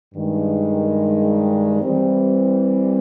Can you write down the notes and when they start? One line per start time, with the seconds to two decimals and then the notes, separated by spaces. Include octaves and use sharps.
0.14 G2 D#3 G#3
1.82 E3 G3 C4